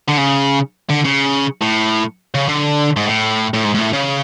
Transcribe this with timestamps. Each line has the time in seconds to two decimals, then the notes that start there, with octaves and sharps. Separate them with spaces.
0.09 D3
0.18 C#3
0.90 D3
1.05 C#3
1.62 A2
2.35 C#3
2.49 D3
2.96 G#2
3.06 A2
3.54 A2
3.64 G#2
3.75 G#2
3.79 A2
3.93 C#3